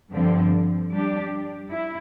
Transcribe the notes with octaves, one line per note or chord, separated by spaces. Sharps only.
G2 D3 F3 C4
G3 D4 G4
E4